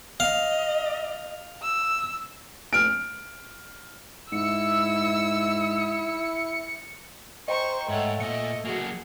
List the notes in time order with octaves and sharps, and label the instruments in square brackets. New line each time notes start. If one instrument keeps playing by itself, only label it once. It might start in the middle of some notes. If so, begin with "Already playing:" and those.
[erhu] D#5 [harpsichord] F5
[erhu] E6
[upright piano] F6 D7
[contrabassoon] G#2 [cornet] E4 [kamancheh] E6 [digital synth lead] C#7
[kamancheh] C5 [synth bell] D#5 G5 A#5 [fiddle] C#6
[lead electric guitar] G#2 [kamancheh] A3 [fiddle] C#5 F#5
[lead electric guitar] A#2 [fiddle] D#5 [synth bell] C#7
[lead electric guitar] F#3 A#3 [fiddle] F#4 G#4